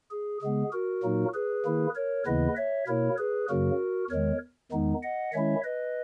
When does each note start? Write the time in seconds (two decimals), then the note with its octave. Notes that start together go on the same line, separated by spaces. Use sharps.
0.11 G#4
0.42 C#3 G#3 B3 G#4
0.73 F#4 A#4
1.03 A#2 F#3 A#3 D#4
1.34 G#4 B4
1.65 D#3 A#3 E4
1.95 A#4 C#5
2.26 D#2 C#3 E3 B3 E4 B4 D#5
2.57 C#5 E5
2.88 B2 A#3 E4 A#4 C#5
3.18 G#4 B4
3.49 F#2 C#3 F#3 A#3 F#4 A#4
4.10 E2 D#3 G#3 A#4 C#5
4.72 E2 D#3 G#3 B3 D#4
5.03 D#5 F#5
5.33 D#3 G#3 C#4 E4 C#5 E5
5.64 B4 D#5